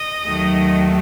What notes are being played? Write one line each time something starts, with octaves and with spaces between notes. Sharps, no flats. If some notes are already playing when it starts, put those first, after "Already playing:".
Already playing: D#5
D#2 D#3 F#3 A3